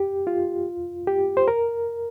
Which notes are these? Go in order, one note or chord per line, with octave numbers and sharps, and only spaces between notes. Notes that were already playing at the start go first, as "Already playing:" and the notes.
Already playing: G4
F4
G4
C5
A#4